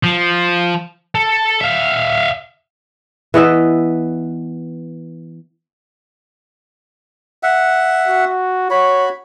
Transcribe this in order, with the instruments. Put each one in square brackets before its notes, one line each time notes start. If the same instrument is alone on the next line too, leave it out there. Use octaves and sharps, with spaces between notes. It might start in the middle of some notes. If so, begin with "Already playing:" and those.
[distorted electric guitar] F3
A4
E5 F5
[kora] E3 B3 D#5 E5
[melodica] E5 F#5
[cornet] F#4
[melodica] F#4 B5 [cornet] C#5